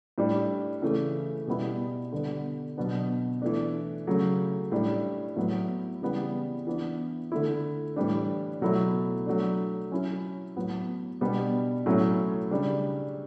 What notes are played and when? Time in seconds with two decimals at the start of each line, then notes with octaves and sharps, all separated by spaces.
0.18 A2 G3 D4
0.82 C#3 E3 A3
1.47 B2 G3 B3 E4
2.12 D3 G3 B3 D4
2.77 B2 F#3 B3 D4
3.42 E3 A3 D4
4.07 C#3 F#3 A3
4.72 A2 G3 D4
5.36 A2 F#3 B3
6.02 C#3 E3 G3 B3 E4
6.67 E3 B3 D4
7.32 D3 A3 E4
7.96 A2 E3 G3 D4
8.61 B2 F#3 A3 E4
9.26 F#3 A3 D4
9.91 F#3 C#4 E4
10.56 A2 F#3 B3
11.21 B2 G3 B3 D4
11.86 A2 F#3 A3 C#4 E4
12.51 C#3 G3 D4